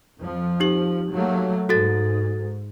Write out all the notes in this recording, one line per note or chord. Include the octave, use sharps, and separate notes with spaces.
F2 F3
D#4 G4 F#7
F#3 A3 A#3
G#2 F#4 A4 A6